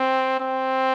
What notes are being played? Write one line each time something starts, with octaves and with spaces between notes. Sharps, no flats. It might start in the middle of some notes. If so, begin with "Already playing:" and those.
Already playing: C4
C4